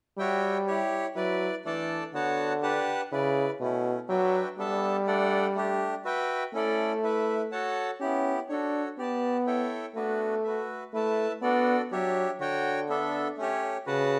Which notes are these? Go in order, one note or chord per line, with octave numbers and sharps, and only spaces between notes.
G3 F#4 C#5 E5 G5
E4 G4 C#5
F#3 E4 B4 D5
E3 A3 D4 A4 D5 A5
D3 B3 F#4 C#5 F#5 A5
D4 G4 B4 F#5 A5
C#3 E4 B4 D5
B2 A3 C#4 E4
F#3 D4 F#4 B4 E5 G5
G3 B3 D4 A4 E5 A5
A3 D4 A4 D5 F#5
A3 D4 G4
F#4 B4 E5 G5
A3 C#4 E4 A4 D5
E4 B4 E5
F#4 A4 C#5 F#5 A5
B3 C#4 E4 G4
D4 F#4 A4 C#5
B3 G4 D5 A5
E4 A4 C#5 E5 G5
A3 B3 D4 F#4 B4
F#4 B4 E5
A3 E4 B4 E5 A5
B3 D4 F#4 A4 D5
F#3 D4 G4 C#5 E5
D3 F#4 C#5 G5
B3 D4 A4 E5
A3 C#4 G4 C#5
C#3 F#4 B4 F#5 A5